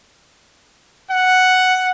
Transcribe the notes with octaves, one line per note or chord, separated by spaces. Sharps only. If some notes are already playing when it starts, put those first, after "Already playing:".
F#5